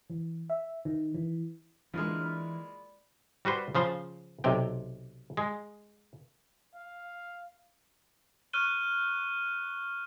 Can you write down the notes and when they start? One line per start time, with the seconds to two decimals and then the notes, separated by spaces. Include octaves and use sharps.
0.10 E3
0.50 E5
0.85 D#3
1.15 E3
1.94 E3 G#3 A#3 D4 F4 F6
2.21 D5 B5
3.45 G3 F#4 B4 C5
3.75 C#3 F3 C5
4.44 B1 C3 G5
5.37 G#3
6.75 F5
8.53 C#6 F6 F#6 D#7 G7